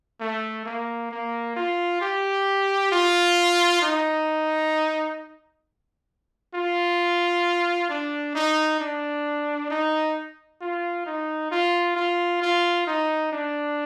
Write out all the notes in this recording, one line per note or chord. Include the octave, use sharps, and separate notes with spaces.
A3
A#3
A#3
F4
G4
F4
D#4
F4
D4
D#4
D4
D#4
F4
D#4
F4
F4
F4
D#4
D4